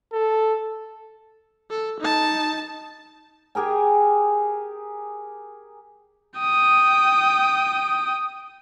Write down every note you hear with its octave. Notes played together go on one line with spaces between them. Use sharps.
A4
A4
D#4 A5
G4 G#4 A#4 G#5
G5 D#6